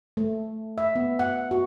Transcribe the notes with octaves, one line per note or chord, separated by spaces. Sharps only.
A3
E5
B3
F#5
F#4